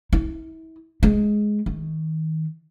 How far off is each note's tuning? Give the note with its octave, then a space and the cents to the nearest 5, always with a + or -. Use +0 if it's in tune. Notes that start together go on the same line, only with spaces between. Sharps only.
E4 -35
G#3 +10
D#3 +30